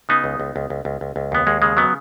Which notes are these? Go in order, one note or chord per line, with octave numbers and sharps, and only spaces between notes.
C#3 B3 D#4
C#2
C#2
C#2
C#2
C#2
C#2
C#2
D#2 B3
D#2 G#3
C#3 G#3
C#3 F#3 B3